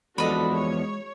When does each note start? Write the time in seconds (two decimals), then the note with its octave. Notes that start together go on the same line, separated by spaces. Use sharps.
0.18 E2 F3 G#3 D4 F#4 A4 D#5 B5
0.53 C#5